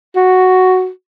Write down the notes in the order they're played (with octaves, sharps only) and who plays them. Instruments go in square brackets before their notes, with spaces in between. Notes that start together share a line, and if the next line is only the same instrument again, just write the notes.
[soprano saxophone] F#4